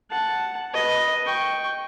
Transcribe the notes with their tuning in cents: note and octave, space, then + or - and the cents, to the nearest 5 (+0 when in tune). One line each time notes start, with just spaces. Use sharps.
F#5 +0 A5 +0
B4 -10 D#5 +0
G5 +0 C#6 +0